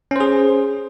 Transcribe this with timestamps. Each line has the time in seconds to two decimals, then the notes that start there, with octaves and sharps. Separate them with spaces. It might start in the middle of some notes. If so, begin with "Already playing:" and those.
0.11 C#4
0.16 C5
0.20 G#4